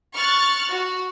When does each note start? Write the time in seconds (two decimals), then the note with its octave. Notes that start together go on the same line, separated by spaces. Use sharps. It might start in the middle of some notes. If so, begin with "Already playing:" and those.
0.13 C#6 F6 F#6 A6
0.69 F#4